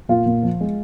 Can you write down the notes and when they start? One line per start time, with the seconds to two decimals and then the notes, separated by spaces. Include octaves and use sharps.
0.09 A#2 F4
0.26 A#2
0.43 F3
0.61 G#3